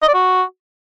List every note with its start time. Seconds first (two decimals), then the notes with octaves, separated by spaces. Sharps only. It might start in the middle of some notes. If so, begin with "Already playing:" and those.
0.02 D#5
0.08 D5
0.14 F#4